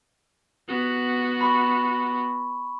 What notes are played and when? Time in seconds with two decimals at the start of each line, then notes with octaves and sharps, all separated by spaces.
0.69 B3 F#4
1.41 B5 C#6